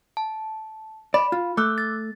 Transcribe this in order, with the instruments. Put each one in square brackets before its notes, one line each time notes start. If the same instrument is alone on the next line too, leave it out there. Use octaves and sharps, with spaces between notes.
[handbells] A5
[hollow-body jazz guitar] D5 [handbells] B5
[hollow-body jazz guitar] F4
[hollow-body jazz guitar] A3 [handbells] D6 E6 F#6
[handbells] A6